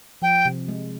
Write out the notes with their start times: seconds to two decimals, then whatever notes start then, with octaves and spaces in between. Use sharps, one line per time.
0.22 F3 G5
0.45 C3
0.68 G#3